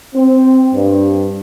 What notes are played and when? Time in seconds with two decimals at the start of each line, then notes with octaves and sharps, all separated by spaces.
0.14 C4
0.74 G2